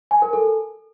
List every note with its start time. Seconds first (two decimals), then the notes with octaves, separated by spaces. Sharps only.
0.11 G#5
0.22 A#4
0.33 A4